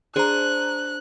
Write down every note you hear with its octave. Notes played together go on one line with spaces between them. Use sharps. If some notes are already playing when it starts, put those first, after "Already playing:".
D4 G#4 C5 G#5 A#5 F#6